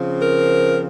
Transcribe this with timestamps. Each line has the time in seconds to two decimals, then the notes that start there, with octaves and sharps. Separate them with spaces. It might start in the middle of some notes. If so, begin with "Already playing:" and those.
Already playing: C#3 F3 C4
0.22 A#4